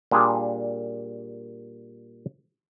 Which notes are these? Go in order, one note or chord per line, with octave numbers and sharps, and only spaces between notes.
A#2 G3 D4 G#4